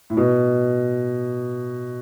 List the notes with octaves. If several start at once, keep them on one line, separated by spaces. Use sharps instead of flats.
A2
B2